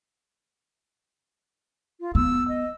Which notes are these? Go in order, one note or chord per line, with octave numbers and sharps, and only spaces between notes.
F4
B3 E6
D#5